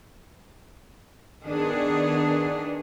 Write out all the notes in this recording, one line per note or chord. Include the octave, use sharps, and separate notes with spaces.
D#3 B3 D4 G#4